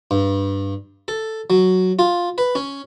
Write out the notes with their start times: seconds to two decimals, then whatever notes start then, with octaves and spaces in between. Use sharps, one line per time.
0.11 G2
1.08 A4
1.50 F#3
1.99 F4
2.38 B4
2.55 C#4